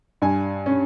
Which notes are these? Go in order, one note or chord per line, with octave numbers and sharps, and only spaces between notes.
G2 G#5
C#4